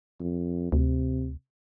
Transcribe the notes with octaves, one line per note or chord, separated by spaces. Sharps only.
F2
D2 C3